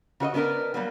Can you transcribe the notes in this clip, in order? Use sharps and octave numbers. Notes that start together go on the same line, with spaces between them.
C#3 F#4 C#5 D#5
B3 C#4 D4 A#4 B4
F#3 G3 A#3 B3